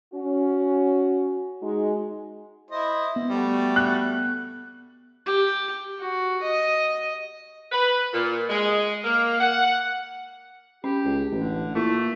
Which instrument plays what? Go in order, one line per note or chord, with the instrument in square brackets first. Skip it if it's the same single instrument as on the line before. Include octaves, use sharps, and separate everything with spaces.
[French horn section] C#4 F#4
G#3 D#4 F#4
[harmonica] E4 C5 D#5
[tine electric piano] B3
[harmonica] G3 A3 F#4
[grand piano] F#6
[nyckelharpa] G4
F#4
D#5
[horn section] B4
A#2
G#3
A#3
F#5
[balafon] C#4 [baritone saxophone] G4
[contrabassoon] C#2
[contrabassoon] A1 [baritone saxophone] D3
[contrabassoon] A#2 [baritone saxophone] A3 [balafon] E4